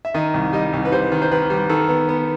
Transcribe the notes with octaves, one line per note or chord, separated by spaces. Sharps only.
E5
D#3 D#5
C2
G3 D#5
C2
B4
G3 C5
D#3
C5
D#3 B4
G3
D#3 A4
B3
B3